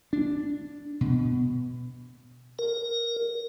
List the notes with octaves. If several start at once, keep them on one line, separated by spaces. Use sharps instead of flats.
D4
B2
A#4